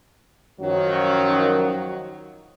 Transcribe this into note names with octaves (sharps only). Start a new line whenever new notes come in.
F#2 D#3 F3 F#3